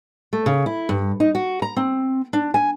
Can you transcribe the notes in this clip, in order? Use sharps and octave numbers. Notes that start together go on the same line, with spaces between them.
A3
C#3
E4
G2
D#4
F#4
A#5
C4
D4
G#5